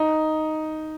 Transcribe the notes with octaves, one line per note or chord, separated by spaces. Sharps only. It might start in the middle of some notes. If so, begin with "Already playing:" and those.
Already playing: D#4